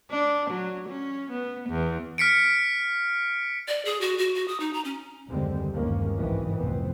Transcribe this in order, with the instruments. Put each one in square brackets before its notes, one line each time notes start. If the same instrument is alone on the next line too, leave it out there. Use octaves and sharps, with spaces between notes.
[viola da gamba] D4
F#3
C#4
B3
E2
[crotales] F6 B6 C#7 D7
[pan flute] D5
G#4
F#4
F#4
F#4
D#6
D#4
A#5
C#4
[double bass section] F#1 D#2 D3 G3 G#3 C4
G1 D#2 G#2 G#3 A#3 C#4
B1 G#2 C3 D#3 E3
F1 C2 F2 B3 C4